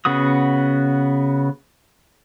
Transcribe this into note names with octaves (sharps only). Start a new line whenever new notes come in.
C#3 B3 F#4 D#6